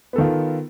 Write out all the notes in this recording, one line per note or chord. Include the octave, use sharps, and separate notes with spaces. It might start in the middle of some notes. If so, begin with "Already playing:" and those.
D#3 B3 F4 A4